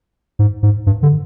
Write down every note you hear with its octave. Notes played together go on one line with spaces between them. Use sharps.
G#2
G#2
G2
D3